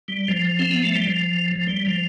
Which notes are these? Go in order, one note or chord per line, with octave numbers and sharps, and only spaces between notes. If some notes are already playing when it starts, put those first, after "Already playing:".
G3
F3
C4
B3
A3
G3
F3
F3
G3
F3